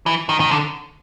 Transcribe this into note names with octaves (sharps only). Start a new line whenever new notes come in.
E3
D#3
D#3
D3